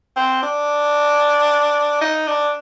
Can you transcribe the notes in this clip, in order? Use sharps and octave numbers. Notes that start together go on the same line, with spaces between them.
C4
D4
D#4
D4